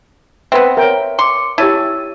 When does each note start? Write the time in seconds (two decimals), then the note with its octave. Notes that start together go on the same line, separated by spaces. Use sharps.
0.52 B3 C4 B4 E5
0.77 A#4 C#5 E5 G5
1.19 C6 D6 C#7
1.58 E4 G4 C#5 A5 E6 D#7